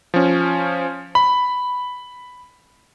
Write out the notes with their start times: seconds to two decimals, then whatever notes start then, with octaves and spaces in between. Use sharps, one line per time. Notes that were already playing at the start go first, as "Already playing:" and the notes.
0.14 F3 C#4
1.15 B5